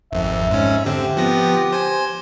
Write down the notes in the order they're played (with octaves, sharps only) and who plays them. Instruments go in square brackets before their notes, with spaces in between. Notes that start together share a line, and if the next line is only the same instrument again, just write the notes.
[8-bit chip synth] G#1 F2 [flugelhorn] E5
[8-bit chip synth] G#2 C#4
[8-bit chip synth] D3 C4 [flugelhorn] G4
[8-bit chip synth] F3 B3 A#6
C5 G#5